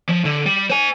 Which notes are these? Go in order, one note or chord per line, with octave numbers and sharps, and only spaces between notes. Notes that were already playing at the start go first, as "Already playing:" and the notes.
F3
D3
G3
C5 G#5